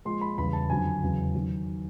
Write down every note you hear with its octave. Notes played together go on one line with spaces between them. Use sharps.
A#2 F3 G#3 C6
B5
E2 C#3 E3 G3 B5
A5
F2 D3 F#3 G#5
E2 C#3 F#3
D#3 F#3